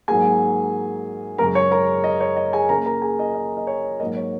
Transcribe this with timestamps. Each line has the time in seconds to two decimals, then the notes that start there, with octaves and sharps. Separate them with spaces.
0.08 G#2 F#3 A#3 G#4 G#5
1.38 F#2 C#3 G#3 A#4 A#5
1.55 C#5 C#6
1.71 A#4 A#5
2.04 D#5
2.20 C#5
2.37 D#5
2.53 G#4 G#5
2.69 C#3 A#4 A#5
2.74 A#3
2.86 A#4 A#5
3.02 G#4 G#5
3.19 D#5
3.35 D#5
3.57 D#5
3.67 C#5
4.00 G#2 F#3 A#3 D#5
4.16 C#5